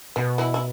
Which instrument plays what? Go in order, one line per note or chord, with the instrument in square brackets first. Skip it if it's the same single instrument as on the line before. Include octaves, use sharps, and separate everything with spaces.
[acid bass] B2 [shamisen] B3
[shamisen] E3 E4
E4